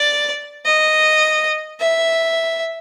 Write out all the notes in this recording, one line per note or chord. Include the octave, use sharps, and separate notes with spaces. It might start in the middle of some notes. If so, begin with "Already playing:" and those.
Already playing: D5
D#5
E5